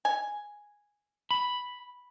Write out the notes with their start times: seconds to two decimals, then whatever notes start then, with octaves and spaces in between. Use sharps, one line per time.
0.05 G#5
1.31 B5